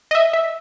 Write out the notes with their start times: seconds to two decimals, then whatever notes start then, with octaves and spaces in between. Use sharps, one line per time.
0.11 D#5
0.15 E5
0.33 E5